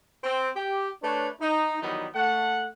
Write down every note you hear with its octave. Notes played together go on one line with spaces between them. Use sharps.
C4
G4
A3 D4 B4 C#5
D#4
D#3 E3 F#3 G3 B3 D#4
A3 F#5